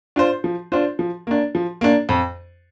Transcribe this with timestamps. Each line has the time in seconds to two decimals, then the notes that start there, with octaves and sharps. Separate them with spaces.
0.16 D4 F4 C5
0.44 F3
0.72 D4 F4 C5
0.99 F3
1.27 A#3 D4
1.55 F3
1.81 A#3 D4
2.09 F2